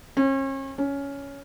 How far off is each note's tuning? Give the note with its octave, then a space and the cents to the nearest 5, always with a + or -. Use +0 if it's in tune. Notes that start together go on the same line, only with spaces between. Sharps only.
C#4 -40
C#4 +10